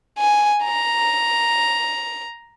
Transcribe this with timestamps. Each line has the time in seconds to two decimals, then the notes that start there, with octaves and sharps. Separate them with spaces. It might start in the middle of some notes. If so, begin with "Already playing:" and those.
0.18 G#5
0.63 A#5